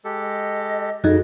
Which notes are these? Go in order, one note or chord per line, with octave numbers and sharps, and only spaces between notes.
G#3 G4 A4
D#5
F#2 C#3 D#4 F#4 G#4 A4 D#5